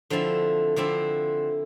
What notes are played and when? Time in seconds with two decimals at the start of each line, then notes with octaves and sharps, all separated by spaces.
0.10 D3 F3 C4 E4
0.76 D3 F3 C4 E4